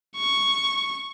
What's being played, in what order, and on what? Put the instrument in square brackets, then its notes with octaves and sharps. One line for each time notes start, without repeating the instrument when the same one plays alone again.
[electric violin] C#6